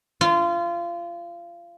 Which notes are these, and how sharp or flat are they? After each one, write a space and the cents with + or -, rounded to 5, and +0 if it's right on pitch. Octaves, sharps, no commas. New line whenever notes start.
F4 -25